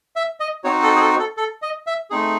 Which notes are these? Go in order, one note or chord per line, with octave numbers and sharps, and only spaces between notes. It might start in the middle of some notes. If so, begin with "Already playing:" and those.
E5
D#5
C4 D#4 F#4 C#5
A4
G#4
A4
A4
A4
D#5
E5
A3 C4 D#4 G#4